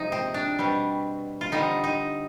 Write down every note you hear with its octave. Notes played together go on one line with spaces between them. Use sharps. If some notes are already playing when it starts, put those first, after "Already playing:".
Already playing: C3 F3 G#3 D#4
C4
D4
B2 G3 C4
F4
D3 G3 C4 D#4
D#4